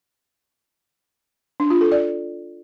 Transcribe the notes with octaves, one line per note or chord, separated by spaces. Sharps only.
D4
F4
A4
D5